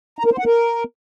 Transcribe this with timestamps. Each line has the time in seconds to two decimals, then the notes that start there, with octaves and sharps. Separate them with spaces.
0.19 A#5
0.25 A#4
0.32 C5
0.39 F#5
0.45 A#4